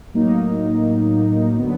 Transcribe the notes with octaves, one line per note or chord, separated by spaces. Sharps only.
A2 F#3 A#3 D#4
D3 F#3 B3